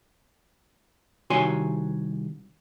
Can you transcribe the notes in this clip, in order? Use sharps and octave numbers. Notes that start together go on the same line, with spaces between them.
C2 D#3 F#4 C#5 G#5 C6